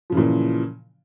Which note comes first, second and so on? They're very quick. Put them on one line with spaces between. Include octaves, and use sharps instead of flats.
F3 C#3 E3 A#2